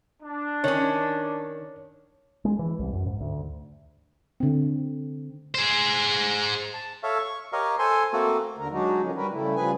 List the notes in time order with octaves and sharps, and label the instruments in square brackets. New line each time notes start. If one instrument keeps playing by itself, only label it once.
[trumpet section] D4
[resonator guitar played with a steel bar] D#3 C#4 [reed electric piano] C#5
[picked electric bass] G#3
E3
C2
F#2
G#2
D2
[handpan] D3 C4
[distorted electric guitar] G#4 C5
[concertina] A5
A4 C#5 E5 F5
C#6
G4 A#4 C#5 D#5 F5
A4 C5 G#5 C6
A3 A#3 C4 F#4 A4
[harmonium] D#2 D3 A#4
F#3 G#3 D4 D#4 F#4
D3 D#3 F3 C#4
G2 G3 F#4 A#4 B4
C#3 G3 A3 E4
C#3 F3 G3 G#4 B4 G#5